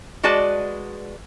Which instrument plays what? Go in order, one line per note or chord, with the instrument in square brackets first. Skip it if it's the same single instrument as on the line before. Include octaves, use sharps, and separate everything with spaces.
[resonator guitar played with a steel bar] G#3 F#4 B4 D5 A5